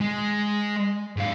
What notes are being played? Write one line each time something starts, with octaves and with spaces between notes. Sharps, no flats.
G#3
G#2 F5